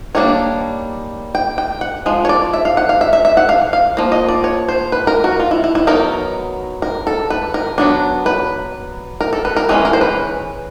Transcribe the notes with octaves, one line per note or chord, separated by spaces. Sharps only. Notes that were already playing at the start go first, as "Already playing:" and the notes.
D#3 G3 A#3 D4 C#5
G5
G5
F#5
F3 G#3
C#5
D5
E5
F5
F#5
F5
E5
E5
E5
F#5
F5
F5
F3 A#3
D#5
D5
C#5
C5
B4
A#4
F#4
F4
E4
E4
E4
F#3 B3 D#4 A#4
A#4
A4
B4
A#4
F#3 B3 D4
B4
A#4
A4
B4
A#4
E3 G#3 C#4 B4
A#4
C5
B4